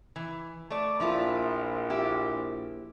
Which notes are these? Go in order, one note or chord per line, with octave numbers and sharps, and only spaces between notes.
E3
A3 D5
A#1 F3 E4 F4
E4 G4